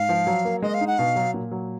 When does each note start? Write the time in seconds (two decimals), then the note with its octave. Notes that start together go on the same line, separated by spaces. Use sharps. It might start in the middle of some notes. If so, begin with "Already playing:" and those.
Already playing: G#2 F5
0.09 F3
0.27 F#3
0.45 A#3
0.62 G#3 D#5
0.74 F5
0.81 D#4
0.87 F#5
0.98 B2 F5
1.16 F#3
1.34 A#2
1.51 F#3